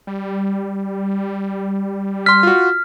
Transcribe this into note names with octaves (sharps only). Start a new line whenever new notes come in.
G3
C6 F6 B6
F4 F#4